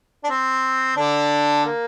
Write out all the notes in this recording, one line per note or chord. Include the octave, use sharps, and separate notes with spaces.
D4
C4
D3 D4
A#3